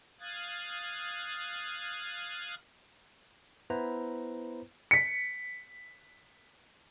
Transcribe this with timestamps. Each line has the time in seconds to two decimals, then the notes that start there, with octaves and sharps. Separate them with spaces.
0.20 F5 D#6 F#6 G#6 A6
3.70 B3 E4 B4 C5 A#5
4.91 B6 C#7